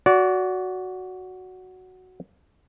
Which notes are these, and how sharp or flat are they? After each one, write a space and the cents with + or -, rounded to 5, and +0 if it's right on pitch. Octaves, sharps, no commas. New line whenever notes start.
F#4 +0 D5 -30